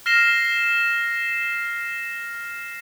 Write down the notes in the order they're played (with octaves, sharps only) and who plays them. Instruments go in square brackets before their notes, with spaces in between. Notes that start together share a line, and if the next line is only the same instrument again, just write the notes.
[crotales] F6 A#6 C7 E7 G7